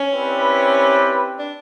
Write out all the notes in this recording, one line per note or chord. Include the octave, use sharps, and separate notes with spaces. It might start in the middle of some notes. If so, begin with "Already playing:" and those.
Already playing: C#4
C4 E4 G4 B4 D5
D4